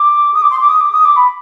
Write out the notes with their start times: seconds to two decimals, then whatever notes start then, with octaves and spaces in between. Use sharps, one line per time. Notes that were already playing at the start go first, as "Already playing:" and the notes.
Already playing: D6
0.34 D#6
0.41 D6
0.50 C6
0.60 D6
0.68 D#6
0.80 D6
0.91 D#6
1.04 D6
1.16 B5